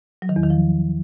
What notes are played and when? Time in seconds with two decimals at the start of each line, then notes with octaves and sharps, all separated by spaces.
0.22 F#3
0.29 D#3
0.36 E2
0.43 D#3
0.50 F3